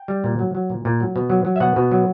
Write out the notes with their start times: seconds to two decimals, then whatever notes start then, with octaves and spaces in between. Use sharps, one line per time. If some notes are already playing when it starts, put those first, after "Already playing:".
Already playing: G5
0.08 G3
0.24 A#2
0.39 F#3
0.55 F#3
0.70 A#2
0.85 A#2
1.00 F#3
1.16 B2
1.30 F#3
1.45 F#3
1.56 E5
1.60 B2 F#5
1.76 B2
1.91 F#3